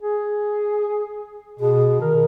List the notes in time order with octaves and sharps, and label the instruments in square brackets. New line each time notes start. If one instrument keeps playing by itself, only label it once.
[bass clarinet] G#4
[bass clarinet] B2 [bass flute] G#4
[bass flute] D#3 [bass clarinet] A#4